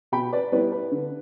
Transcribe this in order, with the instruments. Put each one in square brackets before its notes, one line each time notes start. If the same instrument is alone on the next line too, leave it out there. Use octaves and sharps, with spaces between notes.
[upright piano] B2 G5 B5
B4 D5
G3 B3 E4 B4 D5
B4
D3